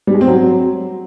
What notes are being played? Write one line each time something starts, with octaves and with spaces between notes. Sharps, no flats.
G3
G#3
C4
F#3